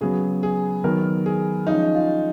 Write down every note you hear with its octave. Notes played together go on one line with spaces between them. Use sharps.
C#3 F#3 B3 G#4
G#4
D#3 F#3 B3 A#4
G#4
F3 G#3 C#4 D#4
F4